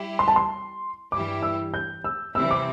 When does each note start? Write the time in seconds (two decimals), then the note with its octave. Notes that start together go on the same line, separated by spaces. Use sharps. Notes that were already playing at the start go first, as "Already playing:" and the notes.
Already playing: G3 E4 G4
0.19 C6
0.28 A5
0.36 C6
1.12 G2 E3 G3 E4 G4 D6
1.43 E6
1.74 G6
2.04 E6
2.35 C3 E3 G3 C4 E4 E6
2.51 D6